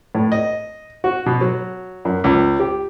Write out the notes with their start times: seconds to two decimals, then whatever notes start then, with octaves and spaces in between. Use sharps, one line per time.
0.15 A2
0.32 D#5
1.04 F#4
1.26 B2
1.41 F#3
2.05 F#2
2.24 C#2
2.60 G4